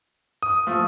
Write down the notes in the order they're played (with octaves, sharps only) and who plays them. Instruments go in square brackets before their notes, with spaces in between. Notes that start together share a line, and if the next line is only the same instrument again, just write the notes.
[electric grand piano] D#6
[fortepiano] F3 A3